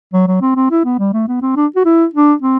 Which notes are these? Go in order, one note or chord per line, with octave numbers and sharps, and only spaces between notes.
F#3
F#3
C4
C4
E4
B3
G3
A3
B3
C4
D4
F#4
E4
D4
C4